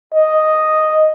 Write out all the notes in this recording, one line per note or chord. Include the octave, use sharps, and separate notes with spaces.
D#5